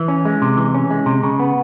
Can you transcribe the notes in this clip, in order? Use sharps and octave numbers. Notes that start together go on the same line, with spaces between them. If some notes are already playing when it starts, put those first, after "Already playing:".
Already playing: E3
C#4
G#3
C3
E3
C#4
G#3
C3
C#3
B3